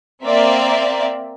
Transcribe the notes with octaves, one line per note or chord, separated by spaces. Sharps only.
A#3 C4 A#4 D5 E5